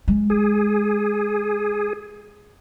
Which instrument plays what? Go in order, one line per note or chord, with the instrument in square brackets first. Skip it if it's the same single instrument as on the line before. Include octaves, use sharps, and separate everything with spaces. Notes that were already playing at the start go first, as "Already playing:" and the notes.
[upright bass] G#3
[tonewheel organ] G#4